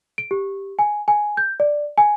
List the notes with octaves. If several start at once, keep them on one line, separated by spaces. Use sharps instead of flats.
D7
G4
G#5
G#5
G6
D5
G#5